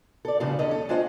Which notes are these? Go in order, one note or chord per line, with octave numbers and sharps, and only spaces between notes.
A4 D5
E2 A2 C#3 F3 G3 D4
D#2 C#4 A4 D#5
A4
C#4 D4 F4 C5 D#5 G5